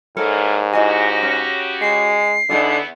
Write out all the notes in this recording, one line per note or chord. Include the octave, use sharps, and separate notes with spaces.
G#2 E3 A3 A#3 A4 A#4 C#5 F6
C#3 E4 F#4 G4 D#5 G#5 A#6
C#4
G#3 C7
E2 D3 B3 D#4 E4 G#4 D5